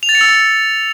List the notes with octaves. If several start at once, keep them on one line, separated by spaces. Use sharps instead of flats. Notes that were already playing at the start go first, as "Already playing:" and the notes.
F7
A6
C#7
E6